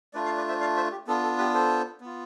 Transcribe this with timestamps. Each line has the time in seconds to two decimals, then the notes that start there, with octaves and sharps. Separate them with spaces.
0.13 A3 D4 F4 B4 D5
0.25 D5 F5
0.37 B4 D5
0.48 C5 E5
0.61 D5 F5
0.76 C5 E5
0.91 G4
1.07 B3 D4 F4 A4
1.23 A4
1.38 G4 B4
1.54 A4 C5
2.01 B3 F4